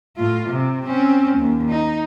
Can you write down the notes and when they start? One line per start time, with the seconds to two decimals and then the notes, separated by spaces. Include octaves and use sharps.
0.17 A2 F4
0.48 C3
0.86 C4 C#4
1.37 D#2
1.69 D#4